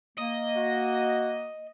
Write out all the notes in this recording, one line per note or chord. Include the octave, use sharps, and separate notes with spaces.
A#3 D#5
F#4